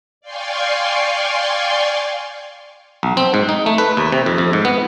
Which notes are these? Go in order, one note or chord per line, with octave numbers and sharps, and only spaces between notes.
D5 F5 G5 G#5 C6 C#6
B1
C4
G#2
D#4
A3
B4
D#2
C3
F2
F2
G#2
B3